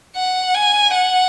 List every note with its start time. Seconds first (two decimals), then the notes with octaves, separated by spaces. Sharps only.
0.16 F#5
0.55 G#5
0.95 F#5